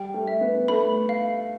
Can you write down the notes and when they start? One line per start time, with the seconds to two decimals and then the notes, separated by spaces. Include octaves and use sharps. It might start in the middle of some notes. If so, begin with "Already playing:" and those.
Already playing: G3 G5
0.14 A3
0.27 E5
0.41 B3
0.68 A3 B5
1.09 F5